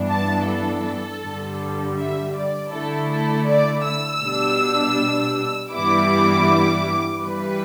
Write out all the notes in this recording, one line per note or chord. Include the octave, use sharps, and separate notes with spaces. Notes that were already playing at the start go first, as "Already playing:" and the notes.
Already playing: G2 E3 B3 D4
A5
A4
G2 D3 G3
E5
D5
D3 A3 E4 A4
A4
D5
E6
B2 G3 D4
G2 E3 G3 B3 E4 D6
G2 E3 G3 B4